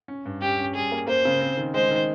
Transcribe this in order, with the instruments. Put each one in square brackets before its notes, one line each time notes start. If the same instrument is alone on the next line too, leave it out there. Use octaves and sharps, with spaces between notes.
[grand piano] C#4
G2
[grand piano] C#4 [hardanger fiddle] G4
[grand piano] C#4
[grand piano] G3 [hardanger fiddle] G#4
[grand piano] A#3
[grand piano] A#3 [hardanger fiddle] C5
[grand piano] C#3
C4
D#3
[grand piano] G#3 [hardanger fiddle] C5
[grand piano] D#3